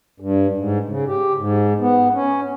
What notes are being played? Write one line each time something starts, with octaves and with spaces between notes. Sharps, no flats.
G2
G#2
C#3
G4
G#2
B3
C#4